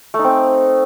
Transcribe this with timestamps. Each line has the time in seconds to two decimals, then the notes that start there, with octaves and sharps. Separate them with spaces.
0.14 A3
0.19 D#4
0.24 C4